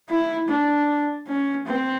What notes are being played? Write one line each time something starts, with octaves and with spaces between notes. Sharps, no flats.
E4
D4
C#4
C4